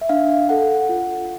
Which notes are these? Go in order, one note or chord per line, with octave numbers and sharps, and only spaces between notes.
E5
D4 F5
A4 F#5
F4